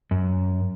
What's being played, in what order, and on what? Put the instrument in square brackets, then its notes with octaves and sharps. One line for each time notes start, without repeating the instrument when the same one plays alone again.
[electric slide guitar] F#2